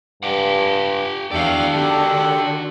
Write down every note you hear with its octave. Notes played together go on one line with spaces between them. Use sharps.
G2 G4 F#5
E2 D4 F#4 D5 F5 G5 E6
D3 D#3 G4 A4